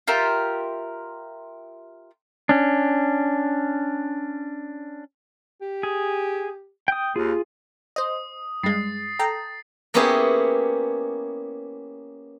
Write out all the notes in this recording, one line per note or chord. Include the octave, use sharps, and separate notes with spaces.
F4 G4 A#4 E5
C#4 D4
G4
G#4
G5 D#6
D#2 F4 G#4
C5 D#5 D#6
G2 G#3 A6 C7
A4 G5 A#5
A#3 B3 C#4 E4 G4 G#4